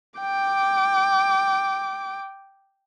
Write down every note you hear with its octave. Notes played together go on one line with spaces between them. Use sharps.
G5 D6